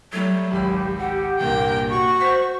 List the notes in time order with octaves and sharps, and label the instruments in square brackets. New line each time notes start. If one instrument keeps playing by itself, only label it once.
[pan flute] F#3 [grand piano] G3 A3
[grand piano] G#1 C#2 B5 [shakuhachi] G4
[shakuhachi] G4 [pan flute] F#5
[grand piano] C2 G2 A#2 [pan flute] A#3 [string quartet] A#4 G5
[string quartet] F#4 [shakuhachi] C#6
[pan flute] C5 [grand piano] B6